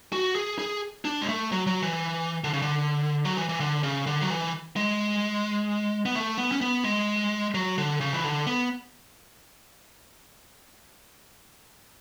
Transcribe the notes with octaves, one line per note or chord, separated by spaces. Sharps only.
F#4
G#4
G#4
D4
G#3
A3
F#3
F#3
E3
D3
C#3
D3
F#3
E3
E3
D3
C#3
D3
F#3
E3
G#3
B3
A3
B3
C#4
B3
G#3
F#3
D3
C#3
E3
D3
B3